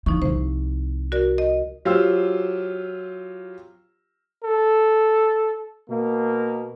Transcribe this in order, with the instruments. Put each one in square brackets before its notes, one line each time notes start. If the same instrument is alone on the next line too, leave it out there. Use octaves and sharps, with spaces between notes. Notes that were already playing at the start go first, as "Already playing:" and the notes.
[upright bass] E3 [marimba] F3 D#4 C#6
[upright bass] C2 E4 [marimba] C5
[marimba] F#4 A#4 D5
D#5
[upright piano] F#3 F4 G4 C5 E6
[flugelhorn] A4
[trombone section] B2 A#3